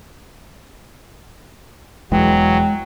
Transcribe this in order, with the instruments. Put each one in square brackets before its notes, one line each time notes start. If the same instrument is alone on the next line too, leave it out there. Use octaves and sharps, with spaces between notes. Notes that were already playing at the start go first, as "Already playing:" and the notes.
[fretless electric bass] E1 E2 E3 [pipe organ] F#3 [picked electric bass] G#3 [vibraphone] G5